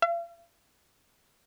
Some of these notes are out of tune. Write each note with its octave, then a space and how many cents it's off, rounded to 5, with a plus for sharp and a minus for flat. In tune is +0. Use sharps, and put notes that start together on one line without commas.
F5 -45